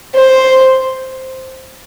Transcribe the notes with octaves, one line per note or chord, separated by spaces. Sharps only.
C5